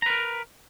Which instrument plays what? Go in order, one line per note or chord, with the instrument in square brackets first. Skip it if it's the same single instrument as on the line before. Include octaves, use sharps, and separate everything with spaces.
[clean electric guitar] A#5
B4
A#4